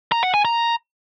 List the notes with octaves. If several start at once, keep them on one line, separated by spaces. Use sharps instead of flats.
A#5
F#5
G#5
A#5